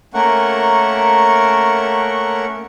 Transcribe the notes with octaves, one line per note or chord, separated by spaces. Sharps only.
A3 A#3 C#4 A#4 F#5 C#6